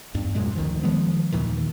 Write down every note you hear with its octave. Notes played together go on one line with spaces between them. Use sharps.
E2 G2
F#2 A#2 G#3
D2 D#3 F3
D#3 F3 G#3 B3
D#2 A#2 D#3 E3